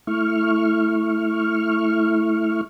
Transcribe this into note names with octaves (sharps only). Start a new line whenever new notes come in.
A3 E4 C#6 F6